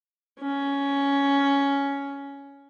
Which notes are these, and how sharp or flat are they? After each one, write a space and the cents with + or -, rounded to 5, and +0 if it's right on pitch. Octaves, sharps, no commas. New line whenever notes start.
C#4 +10